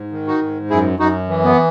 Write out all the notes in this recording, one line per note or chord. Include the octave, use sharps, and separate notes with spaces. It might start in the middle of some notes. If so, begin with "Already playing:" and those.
Already playing: G#2
D#3
D#4 F#4
G#2
F#2 E4 G#4
F#2 D#4 F#4
E3
B3